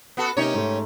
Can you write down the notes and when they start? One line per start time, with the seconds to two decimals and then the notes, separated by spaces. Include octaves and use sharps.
0.17 B3 F#4 A4
0.37 C3 A#3 C#4 D#4 G4 C#5
0.54 G#2 A3